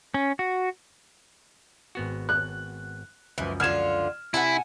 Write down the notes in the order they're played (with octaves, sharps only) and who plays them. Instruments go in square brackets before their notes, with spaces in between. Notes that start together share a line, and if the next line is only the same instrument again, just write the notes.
[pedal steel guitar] C#4
F#4
[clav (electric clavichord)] G#1 B3 F#4
[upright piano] F#6
[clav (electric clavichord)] C#2 F#2 F3 [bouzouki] E3
[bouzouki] D3 F4 [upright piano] F6 G#6 E7
[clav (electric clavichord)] C3 [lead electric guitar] E4 [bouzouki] F#5 G#5 A5